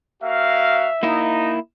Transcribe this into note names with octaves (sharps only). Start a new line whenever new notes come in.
A#3 F#4 E5 F5
A#3 D#4 E4